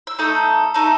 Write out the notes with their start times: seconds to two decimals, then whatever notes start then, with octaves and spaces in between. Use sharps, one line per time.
0.07 E6
0.19 A3 D#4 A4 D#6
0.74 A3 D#4 A4